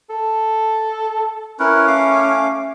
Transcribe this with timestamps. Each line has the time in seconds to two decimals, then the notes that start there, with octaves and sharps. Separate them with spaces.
0.10 A4
1.60 C#4 E4 A#4 B4
1.87 A3 F5 D6